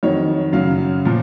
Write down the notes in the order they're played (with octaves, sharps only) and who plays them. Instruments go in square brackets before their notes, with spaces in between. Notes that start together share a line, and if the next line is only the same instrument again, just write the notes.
[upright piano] F2 D#3 F#3 C#5
F#2 C#3 F#3 F5
A#2 F3